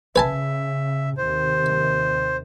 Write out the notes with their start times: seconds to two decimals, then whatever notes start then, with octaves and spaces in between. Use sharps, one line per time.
0.16 C#3 B4 E5 G#5 A5
1.17 D#2 C3 D#3 C5